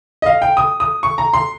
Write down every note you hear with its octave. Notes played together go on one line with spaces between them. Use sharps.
D#5
F5
G5
D#6
D#6
C#6
A#5
C6